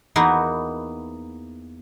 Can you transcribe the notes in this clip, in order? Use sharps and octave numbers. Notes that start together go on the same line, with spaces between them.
E2 A#3 D#4 F#4 A#4 B4